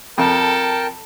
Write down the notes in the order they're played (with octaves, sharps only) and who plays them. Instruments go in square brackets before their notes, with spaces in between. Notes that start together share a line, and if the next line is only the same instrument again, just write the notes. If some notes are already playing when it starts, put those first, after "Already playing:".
[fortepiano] F2 [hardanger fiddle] A4 [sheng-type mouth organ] A#4 G5 A5